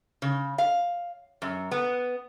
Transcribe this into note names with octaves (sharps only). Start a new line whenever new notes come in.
C#3
F5
F#2
B3